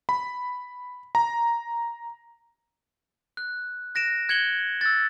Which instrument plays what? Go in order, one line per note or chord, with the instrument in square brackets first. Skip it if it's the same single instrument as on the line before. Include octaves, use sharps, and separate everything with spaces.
[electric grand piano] B5
A#5
[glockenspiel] F#6
F#6 A#6 D7 E7
F#6 G#6 C#7 F#7 G7
E6 F#6 A6